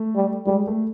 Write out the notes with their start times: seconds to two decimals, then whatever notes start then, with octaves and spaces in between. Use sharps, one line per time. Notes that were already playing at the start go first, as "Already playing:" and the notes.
Already playing: A3
0.16 G3
0.47 G3 G#3
0.67 A3